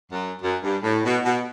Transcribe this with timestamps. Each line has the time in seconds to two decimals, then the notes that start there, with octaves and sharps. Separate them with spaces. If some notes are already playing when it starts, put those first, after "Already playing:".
0.12 F#2
0.42 F#2
0.63 G2
0.83 A2
1.05 B2
1.25 B2